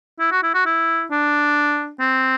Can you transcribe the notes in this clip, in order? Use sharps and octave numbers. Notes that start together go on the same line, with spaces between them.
E4
F#4
E4
F#4
E4
D4
C4